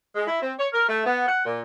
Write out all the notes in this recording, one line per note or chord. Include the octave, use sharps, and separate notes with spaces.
G#3
E4
C4
C#5
A#4
A3
B3
F#5
A#2